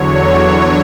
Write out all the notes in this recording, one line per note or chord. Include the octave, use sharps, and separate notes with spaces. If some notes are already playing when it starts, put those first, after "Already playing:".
Already playing: E2 D3 F#3 C#5